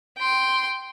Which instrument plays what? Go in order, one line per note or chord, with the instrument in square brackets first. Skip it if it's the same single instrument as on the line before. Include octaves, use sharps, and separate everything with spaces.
[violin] G5 C6